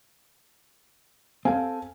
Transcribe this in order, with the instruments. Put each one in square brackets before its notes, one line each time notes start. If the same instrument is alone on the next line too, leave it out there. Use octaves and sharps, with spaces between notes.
[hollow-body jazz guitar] C4 A4 [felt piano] F5 G#5